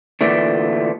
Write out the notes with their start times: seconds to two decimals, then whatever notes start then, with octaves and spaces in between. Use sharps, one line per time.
0.21 D2 A#2 D3 E3 A3 D4